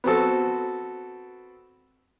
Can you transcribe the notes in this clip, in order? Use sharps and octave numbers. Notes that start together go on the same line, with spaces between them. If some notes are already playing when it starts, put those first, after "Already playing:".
B3 C4 F#4 A4